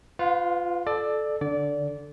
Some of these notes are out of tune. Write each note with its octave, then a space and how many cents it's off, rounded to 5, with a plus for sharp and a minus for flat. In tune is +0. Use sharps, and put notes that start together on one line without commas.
F4 +0 B4 +35 F5 +45
A4 -15 D5 +20
D3 +0 D5 -20